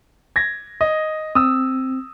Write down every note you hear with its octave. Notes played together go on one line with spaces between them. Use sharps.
G#6 A#6
D#5
C4 D#6 E6